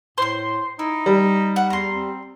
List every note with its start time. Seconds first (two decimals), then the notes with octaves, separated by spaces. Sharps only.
0.18 A2 C5 C6
0.79 D#4 E4
1.06 G3
1.56 F#5
1.70 E2 A#5 C6
1.93 C4